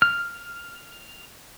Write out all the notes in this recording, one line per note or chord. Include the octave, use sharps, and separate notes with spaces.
F6